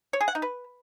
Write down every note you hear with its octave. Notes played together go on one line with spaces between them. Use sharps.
C#5
G#4
F#5
D#4
B4